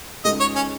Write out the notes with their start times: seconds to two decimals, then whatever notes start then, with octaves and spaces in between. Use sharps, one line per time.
0.25 C#2 C#3 G#3 D#4 D#5
0.40 C#5
0.56 C#4